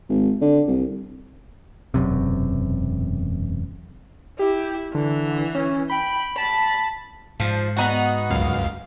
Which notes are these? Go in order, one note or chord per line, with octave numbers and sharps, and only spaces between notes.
G#1
D3
C2
E1 F#2 C3
E4 G4
D3 E3
C#4
G5 B5
A5 B5
G#2 F3
B3 D#4 F#4
C#2 F#2 F5